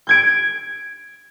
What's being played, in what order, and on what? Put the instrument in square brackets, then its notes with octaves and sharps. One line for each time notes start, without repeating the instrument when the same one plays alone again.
[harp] G6 G#6 D7